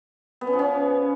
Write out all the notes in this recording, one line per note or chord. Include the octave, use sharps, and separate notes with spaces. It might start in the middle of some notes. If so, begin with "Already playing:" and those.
B3
C#4
F3
C#4